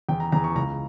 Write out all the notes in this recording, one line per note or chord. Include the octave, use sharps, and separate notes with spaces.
E2 G5
A#5
E2 A#5
C#6
C#2 A#5